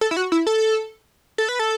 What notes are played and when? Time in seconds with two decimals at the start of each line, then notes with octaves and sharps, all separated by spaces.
0.01 A4
0.11 E4
0.17 F#4
0.32 E4
0.47 A4
1.38 A4
1.49 B4
1.59 A4